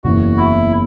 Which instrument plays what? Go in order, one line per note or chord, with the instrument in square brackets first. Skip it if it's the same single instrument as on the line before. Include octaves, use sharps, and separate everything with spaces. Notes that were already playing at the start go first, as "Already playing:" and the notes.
[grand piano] F#1 E2 E3 B3 [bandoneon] F#4
[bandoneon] E4